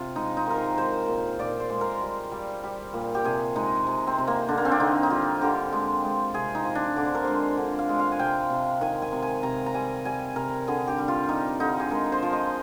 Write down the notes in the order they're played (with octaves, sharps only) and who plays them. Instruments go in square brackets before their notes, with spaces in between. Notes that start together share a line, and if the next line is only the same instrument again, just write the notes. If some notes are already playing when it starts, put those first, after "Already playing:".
Already playing: [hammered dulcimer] C3 F4
G#3 D#4
D#4
D#3 A#4
C5
G#3 C5
A#2
A#2 D5
C5
G#3
A#4
G3
G3
G3
A#2
G4
C3 G#4
G#3 D#4
C3
C4
C3
A#3
D3 D4
A#3
C4
D4
D3 D#4
D#4
G3 F4
D3 G4
G#3
G#3
C3 G#4
D#4
F3
D4
D3 D5
C5
A#4
G#3 C5
D3
F5
G#3
F5
G#5
C3 G5
C3
D#3 G#5
G#5
C3
G#5
C3 A#5
A#5
G3 G#5
G3 G#5
C3 A#4
D3 G#4
G4
G3
F4
G3 D#4
D3 D#4
G#4
G#3 A#4
C5
F3
D#5